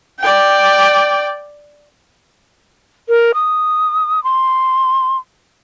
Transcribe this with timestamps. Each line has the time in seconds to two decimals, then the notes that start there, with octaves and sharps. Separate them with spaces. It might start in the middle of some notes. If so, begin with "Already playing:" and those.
0.20 D5 G5
3.09 A#4
3.34 D#6
4.24 C6